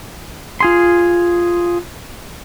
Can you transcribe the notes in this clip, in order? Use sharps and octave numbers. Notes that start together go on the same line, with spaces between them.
F4 G#4 C6